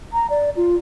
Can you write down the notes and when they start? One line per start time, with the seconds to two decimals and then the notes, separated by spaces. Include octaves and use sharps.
0.13 A#5
0.30 D5
0.57 F4